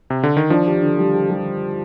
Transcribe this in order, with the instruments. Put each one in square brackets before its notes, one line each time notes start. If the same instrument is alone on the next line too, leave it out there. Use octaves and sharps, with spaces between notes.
[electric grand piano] C3
D3
D#3
[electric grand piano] F3 [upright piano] D4
[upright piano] G4
D3
G3
G4
G3